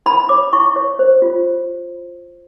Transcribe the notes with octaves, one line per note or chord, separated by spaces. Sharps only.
E4 B5
C#5 D6
E4 C#6
C#5
C5
F4